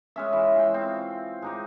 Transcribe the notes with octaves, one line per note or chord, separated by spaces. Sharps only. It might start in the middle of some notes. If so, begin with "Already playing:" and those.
G#3 C#4 E5
E3
F4 G5
C4
G#3 D#4 G4